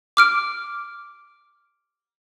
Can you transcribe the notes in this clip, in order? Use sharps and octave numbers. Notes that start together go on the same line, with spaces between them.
D6 F6 D7